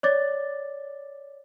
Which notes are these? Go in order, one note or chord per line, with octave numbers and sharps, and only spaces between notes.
C#5 D5 D6 A6